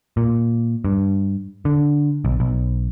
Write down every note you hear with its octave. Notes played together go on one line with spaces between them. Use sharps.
A#2
G2
D3
B1
B1